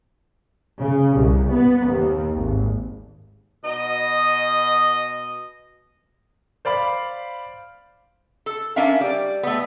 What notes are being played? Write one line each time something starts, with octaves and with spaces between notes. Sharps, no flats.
C#3
C2
B3
D#2
G#1
B2 D#5
C5 D5 F5 B5
A4
C#4 D4 A#4 E5 F5
G3 D5
A3 B3